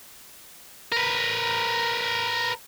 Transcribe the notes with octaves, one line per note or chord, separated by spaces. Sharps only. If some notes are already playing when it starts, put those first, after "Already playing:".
A#4 B4